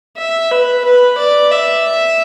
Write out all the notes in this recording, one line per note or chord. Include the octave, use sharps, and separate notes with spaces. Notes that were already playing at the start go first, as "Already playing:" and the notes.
E5
B4
B4
D5
E5